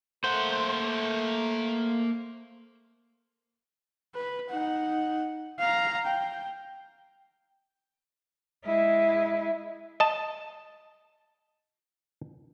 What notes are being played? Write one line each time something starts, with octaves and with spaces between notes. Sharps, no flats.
A3 A#3 C5 F#5
B4
D#4 F#5
F5 A#5
G5
G#3 E4
D#5 A5